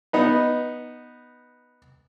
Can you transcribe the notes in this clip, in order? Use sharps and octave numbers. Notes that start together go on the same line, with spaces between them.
B3 D#4 B4